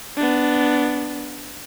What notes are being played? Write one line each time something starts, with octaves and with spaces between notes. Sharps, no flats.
B3 D4